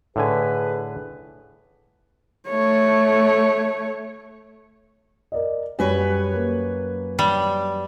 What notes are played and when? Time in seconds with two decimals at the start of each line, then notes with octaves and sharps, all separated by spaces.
0.16 A2 D3 G#4 B4 G#5
2.48 A3 C#5
5.32 A#4 D5 D#5
5.79 F#2 G3 B4 C#5 G#5
6.33 A#3
7.19 G3